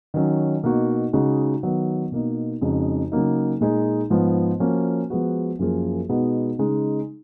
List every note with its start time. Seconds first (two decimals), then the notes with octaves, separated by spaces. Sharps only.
0.14 D#3 F#3 C#4
0.63 B2 A#3 D#4 F#4
1.13 C#3 G#3 D#4 F#4
1.63 D#3 F#3 B3
2.12 B2 A#3 D#4
2.61 F2 C#3 G#3 D#4 F#4
3.12 C#3 F#3 A#3 D#4
3.61 A#2 G#3 D#4 G#4
4.10 G#2 F3 B3 F4
4.60 F3 A#3 C#4 F#4
5.10 F3 G#3 B3 F#4
5.59 F#2 F3 A#3 F4 G#4
6.09 B2 G#3 B3 D#4 F#4
6.59 C#3 G#3 D#4